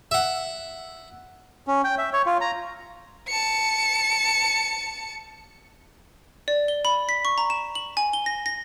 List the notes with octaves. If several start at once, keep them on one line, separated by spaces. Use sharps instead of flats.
E5 F#5
C#4
G5
E5
C#5
F4
A#5
A5 C#7
D5
G7
B5
B6
C#6
A#5
E7
F#7
G#5
G7
A#6
A#6